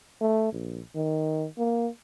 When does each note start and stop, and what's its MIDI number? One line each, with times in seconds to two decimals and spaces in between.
0.21 0.48 57
0.53 0.81 34
0.96 1.47 51
1.58 1.88 58